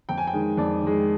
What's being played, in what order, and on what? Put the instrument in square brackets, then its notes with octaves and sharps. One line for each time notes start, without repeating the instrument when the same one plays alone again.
[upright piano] F2 G5
G#5
G5
D#3 G#3
F2 D5
D#3 G#3